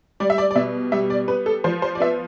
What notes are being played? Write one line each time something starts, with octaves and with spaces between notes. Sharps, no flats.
G3 D5
E5
D5
D5
B2 E5
G3 E5
D5
B3 B4
A4
F3 C5
C5
D5
B3 E5